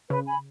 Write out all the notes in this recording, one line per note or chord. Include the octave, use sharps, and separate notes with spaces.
C#3 B4
G#5 B5